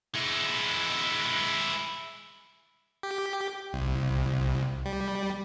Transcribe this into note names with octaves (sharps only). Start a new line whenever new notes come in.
G#3 E4
G4
C2
G3